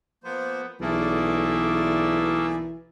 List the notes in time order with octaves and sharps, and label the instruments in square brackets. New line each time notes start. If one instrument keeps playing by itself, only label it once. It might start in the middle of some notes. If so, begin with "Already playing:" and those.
[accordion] F3 A#3 C5 [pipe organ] B3
[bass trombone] B1 [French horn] E3 [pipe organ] A3 A#3 E4 [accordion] G#4 D5